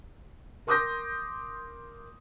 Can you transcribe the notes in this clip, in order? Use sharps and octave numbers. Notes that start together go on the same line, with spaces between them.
A#4 C6 D6 D#6 G6 A#6